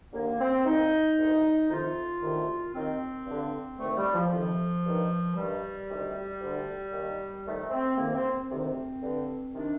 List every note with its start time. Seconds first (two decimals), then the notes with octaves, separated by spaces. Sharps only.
0.13 D#2 D3 A#3
0.40 C4
0.65 C2 A#2 D#4
1.18 D2 C3 D#3
1.70 F2 C3 D#3 F4
2.22 D2 C3 D#3
2.75 D#2 D#3 C4
3.26 G2 D3
3.79 D2 C3 D#3 A3
3.97 G3
4.14 F3
4.31 F2 C3 D#3 F3
4.84 G2 D#3
5.36 G2 D#3 G3
5.89 D2 C3 D#3
6.41 D2 D3
6.92 D#2 D#3
7.45 F2 D#3 A3
7.71 C4
7.97 F2 C3 D#3 A#3
8.15 C4
8.32 C4
8.50 D2 C3 D#3
9.03 G2 D3
9.54 C3 D#3 D4